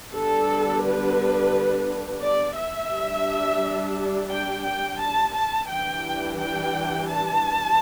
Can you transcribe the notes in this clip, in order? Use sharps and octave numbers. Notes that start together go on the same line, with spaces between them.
D3 G3 B3 D4 A4
B4
D5
E5
G3 D4
G5
G5
A5
A5
E3 G3 D4 G5
G5
A5